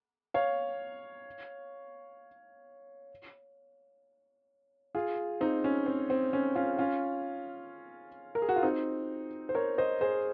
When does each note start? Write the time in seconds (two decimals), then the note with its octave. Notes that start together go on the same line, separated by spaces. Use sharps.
0.34 C#5 F5
4.95 F4 G#4
5.41 C4 D#4
5.64 C#4
5.86 C4
6.10 C4
6.33 C#4
6.55 C#4 F4
6.79 C#4 F4
8.35 A#4
8.42 G#4
8.49 F#4
8.56 F4
8.63 C4 D#4
9.49 C5
9.55 A#4 C#5
9.78 C5 D#5
10.01 G#4 C5